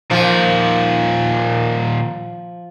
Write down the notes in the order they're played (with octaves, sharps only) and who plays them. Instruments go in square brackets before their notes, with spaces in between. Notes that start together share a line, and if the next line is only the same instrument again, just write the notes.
[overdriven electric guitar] A#2 D#3 [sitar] F3